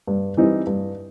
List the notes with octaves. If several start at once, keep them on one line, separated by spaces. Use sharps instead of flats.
G2
E3 G3 C4 D#4
G2